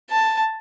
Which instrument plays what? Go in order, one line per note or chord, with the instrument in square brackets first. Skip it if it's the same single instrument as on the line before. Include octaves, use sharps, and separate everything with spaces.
[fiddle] A5